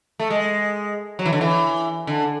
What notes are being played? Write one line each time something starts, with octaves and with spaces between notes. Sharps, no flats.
A3
G#3
F#3
E3
D3
E3
D3